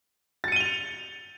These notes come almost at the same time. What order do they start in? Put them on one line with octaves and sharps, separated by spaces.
A6 C#7 D#7 G7 F7